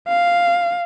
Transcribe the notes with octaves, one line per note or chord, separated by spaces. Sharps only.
F5